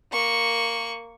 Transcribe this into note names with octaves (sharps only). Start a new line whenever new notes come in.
A#3 C#6